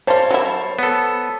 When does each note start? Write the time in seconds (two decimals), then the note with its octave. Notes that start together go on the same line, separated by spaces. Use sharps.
0.07 G3 F4 C5 C#5 A5
0.31 F#3 G3 E4
0.79 B3 A4